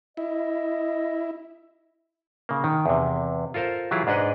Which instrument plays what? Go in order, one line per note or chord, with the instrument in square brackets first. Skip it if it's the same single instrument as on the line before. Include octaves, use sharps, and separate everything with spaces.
[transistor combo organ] E4 [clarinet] D#5
[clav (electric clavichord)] C#3 A#3
D#3
E2 C3
F4 A4 A#4 C5 F5
E3 F#3 E4 F4 G4 G#4
G#2 D4 G#4 B4 D#5 F#5